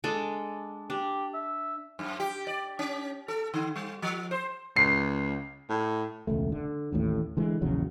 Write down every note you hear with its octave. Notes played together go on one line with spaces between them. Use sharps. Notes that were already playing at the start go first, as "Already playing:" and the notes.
G#3 D4 A4
D4 G4
E5
F#2
G4
D5
C#4
A4
D3
G3
F3
C5
C#2 C7
A2
E1 C#2 A3
D3
A1 D#2 A2
D3 E3 G#3
A#1 E2 C#3 F#3